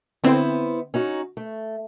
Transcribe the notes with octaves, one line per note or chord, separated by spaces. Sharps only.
D3 B3 C4 E4 C5
C#4 D#4 F#4
A3